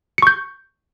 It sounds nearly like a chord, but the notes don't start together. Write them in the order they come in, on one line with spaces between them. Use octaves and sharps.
C#7 C#6 G6